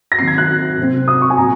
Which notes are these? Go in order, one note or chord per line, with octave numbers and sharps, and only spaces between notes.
A#6
D#3 F#3 C4 C7
G#6
F#6
C3 F#3 C4
D#6
C#6
G#5
A#2 F#3 C4 A#5